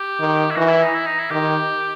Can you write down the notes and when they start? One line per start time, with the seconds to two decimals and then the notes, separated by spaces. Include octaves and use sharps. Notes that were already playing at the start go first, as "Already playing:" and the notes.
Already playing: G4
0.20 D#3
0.51 E4
0.56 E3 F#4
0.69 E4
0.82 D#4
0.94 E4
1.06 D#4
1.19 E4
1.31 D#3 G4